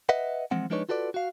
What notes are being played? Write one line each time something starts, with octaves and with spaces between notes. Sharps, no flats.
B4 D#5 E5 F#5
E3 F3 G#3 C4 F#5
F3 G#3 D4 D#4 B4 C#5
F4 F#4 A4 B4 D5
F#4 F5